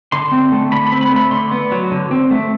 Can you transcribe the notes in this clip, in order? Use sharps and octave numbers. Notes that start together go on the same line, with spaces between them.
D3 C6
C4
A3
D3 B5
B5
C4
B5
A3 B5
D3 C6
B3
F#3
D3
C4
A3